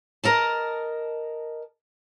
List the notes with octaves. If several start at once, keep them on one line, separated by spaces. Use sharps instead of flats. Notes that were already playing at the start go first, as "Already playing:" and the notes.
A#4 D#5 A5